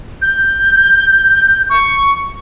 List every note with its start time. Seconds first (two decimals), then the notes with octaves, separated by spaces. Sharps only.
0.22 G6
1.70 C#6